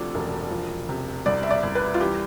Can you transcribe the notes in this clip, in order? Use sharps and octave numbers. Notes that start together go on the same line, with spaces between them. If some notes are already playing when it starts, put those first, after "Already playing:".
Already playing: D2 C3 F3 D4 A4
E1
F3
C3
C2 D5
E5
D5
C2
B4
F4
E3 G4